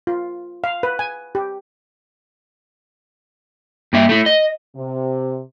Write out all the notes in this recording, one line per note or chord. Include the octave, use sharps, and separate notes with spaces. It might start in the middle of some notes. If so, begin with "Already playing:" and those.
F4
F5
B4
G#5
G4
G2 A#3 E5
A3 E4
D#5
C3